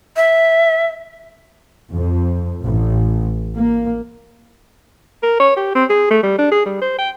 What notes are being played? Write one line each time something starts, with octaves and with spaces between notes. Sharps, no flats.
E5
F2
A1
A#3
A#4
C#5
G4
C4
G#4
A3
G3
D4
G#4
G3
C5
G5